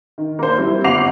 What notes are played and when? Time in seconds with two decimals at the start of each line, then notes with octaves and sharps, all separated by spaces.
0.18 D#3
0.39 A#3 C5
0.58 G3 C4 E4
0.84 G1 C4 F#5 D6 C7 F7